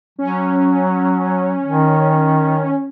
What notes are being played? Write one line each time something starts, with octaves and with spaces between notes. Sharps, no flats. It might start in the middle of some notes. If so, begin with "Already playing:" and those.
F#3 C#4
D#3